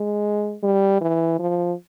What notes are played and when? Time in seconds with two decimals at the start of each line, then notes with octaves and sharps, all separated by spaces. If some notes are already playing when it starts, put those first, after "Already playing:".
Already playing: G#3
0.63 G3
1.01 E3
1.39 F3